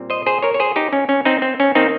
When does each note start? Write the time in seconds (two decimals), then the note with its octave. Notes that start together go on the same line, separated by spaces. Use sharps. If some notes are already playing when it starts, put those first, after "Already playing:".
Already playing: A#2 G3 C4
0.10 C5 D#5
0.26 G#4 C5
0.42 A#4 C#5
0.54 C#5
0.60 G#4 C5
0.76 D#4 G4
0.93 C#4
1.09 C#4
1.25 C4 D#4
1.42 C4
1.60 C#4
1.75 D#3 A#3 C4 D#4